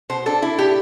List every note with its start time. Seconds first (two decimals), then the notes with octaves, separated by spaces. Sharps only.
0.09 B2 C5
0.26 D4 A4
0.42 D4 E4
0.58 A2 G4